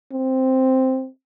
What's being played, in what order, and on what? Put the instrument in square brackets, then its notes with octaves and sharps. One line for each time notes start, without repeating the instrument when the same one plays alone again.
[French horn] C4